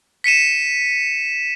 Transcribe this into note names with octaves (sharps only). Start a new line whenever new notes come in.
B6 C#7 D#7 E7